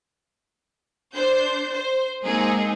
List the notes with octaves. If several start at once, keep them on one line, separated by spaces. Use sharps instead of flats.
D4 C5 G6
C5
G#3 A#3 C4 D#4 G#4